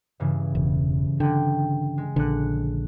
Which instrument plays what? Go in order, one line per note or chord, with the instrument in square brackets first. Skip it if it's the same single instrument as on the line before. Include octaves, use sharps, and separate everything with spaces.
[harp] G2 C#3 E3
[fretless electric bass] E1
[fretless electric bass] D3 [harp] G5
[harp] G#3
[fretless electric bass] A#1 D3 [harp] F#6 C#7